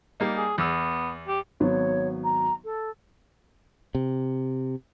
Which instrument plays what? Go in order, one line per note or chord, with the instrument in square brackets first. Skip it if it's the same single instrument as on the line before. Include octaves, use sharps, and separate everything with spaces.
[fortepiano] G3 A#3 D#4
[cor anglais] G#4
[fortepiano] E2 E6 [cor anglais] B3
[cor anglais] G4
[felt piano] G#1 F#3 B3 [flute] C#5
[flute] A#5
A4
[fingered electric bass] C3